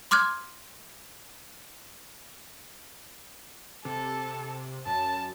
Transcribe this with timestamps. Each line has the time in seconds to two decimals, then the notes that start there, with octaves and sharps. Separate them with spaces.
0.11 C6 D6 F6 F#6 G#6
3.85 C3 A4
4.86 F#2 A5